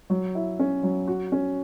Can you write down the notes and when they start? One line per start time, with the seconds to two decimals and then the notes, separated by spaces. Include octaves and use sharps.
0.10 F#3
0.35 E4
0.59 C#4
0.83 F#3
1.07 F#4
1.32 C#4